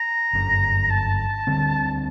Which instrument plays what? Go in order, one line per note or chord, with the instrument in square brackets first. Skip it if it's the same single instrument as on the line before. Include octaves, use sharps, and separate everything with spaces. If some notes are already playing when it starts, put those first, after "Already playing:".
Already playing: [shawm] A#5
[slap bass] G1 F#2 D3
[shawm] A5
[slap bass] D2 D3 G3 C4